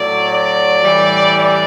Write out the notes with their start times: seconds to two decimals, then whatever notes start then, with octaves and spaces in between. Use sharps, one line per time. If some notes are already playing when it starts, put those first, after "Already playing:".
Already playing: A2 F#3 D5
0.32 D5
0.83 A2 E3 G3
1.37 D5